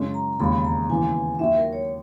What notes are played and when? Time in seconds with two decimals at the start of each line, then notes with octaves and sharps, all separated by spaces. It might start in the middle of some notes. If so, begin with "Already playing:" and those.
Already playing: F#2 C#3 G#3 C#4
0.14 A#5
0.39 E1 D#2 C#3 B5
0.64 A#5
0.89 D#2 C#3 E3 B3 G#5
1.39 D#2 D#3 F#3 E5
1.56 A#4
1.73 C#5